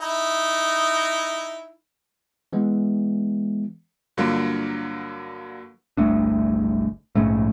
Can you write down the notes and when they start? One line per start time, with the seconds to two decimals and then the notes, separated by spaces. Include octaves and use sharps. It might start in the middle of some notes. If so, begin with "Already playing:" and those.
0.01 D#4 E4
2.53 E3 G#3 B3
4.17 G2 D3 F#3 A#3 F4
5.97 G1 C2 A3 D4
7.15 A#1 G#2 C#3 A3